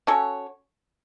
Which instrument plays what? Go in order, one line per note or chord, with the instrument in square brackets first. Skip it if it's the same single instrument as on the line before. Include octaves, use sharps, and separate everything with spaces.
[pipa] C#4 F#4 A4 C#5